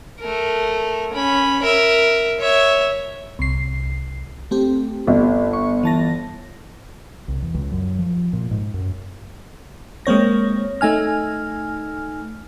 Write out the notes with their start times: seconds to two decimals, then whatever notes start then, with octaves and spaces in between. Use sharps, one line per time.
0.20 A3 A#4
1.13 C#4 B5
1.63 A#4 E5
2.40 C#5 E5
3.39 C2 C7
4.51 A3 C4 G4
5.07 G1
5.53 C#6
5.83 E3 A5 A#6
7.28 C2
7.42 E2
7.54 C#2
7.72 F#2
7.99 F3
8.33 A#2
8.51 G#2
8.74 F#2
10.06 G#3 A#3 C4 C#5 A#6
10.81 A3 D#4 G#5 F6